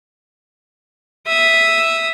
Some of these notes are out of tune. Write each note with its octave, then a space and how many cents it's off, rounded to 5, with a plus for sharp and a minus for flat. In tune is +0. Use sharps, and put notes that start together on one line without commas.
E5 +0 D#6 +0